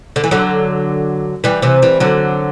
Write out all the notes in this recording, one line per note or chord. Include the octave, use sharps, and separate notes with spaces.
D3
E3
D3 F#3
E3 G3
C3 E3
E3 G3
D3 F#3